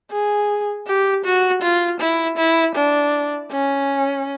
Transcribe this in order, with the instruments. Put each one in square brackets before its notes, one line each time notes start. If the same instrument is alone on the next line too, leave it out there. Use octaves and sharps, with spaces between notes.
[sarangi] G#4
G4
F#4
F4
E4
E4
D4
C#4